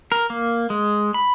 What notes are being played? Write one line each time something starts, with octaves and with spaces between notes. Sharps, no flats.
A#4
A#3
G#3
B5